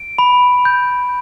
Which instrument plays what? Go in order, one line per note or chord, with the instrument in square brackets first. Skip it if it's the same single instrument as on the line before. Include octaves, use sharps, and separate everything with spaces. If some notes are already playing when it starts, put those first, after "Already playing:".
Already playing: [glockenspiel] D7
B5
G6